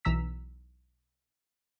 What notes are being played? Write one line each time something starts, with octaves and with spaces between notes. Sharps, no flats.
B1 E3 A#5 E6 B6